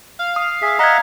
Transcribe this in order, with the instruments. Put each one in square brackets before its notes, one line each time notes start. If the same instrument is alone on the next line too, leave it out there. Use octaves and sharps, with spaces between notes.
[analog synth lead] F5
[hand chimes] D#6
[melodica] G#4 E5
[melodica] D#5 E5 F#5 [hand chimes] A#5 G#6